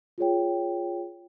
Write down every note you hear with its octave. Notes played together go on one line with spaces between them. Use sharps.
F4 G#4 C#5 G5